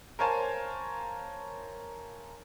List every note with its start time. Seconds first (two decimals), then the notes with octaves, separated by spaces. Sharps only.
0.19 A#4 C5 C#5 F5 G#5 A5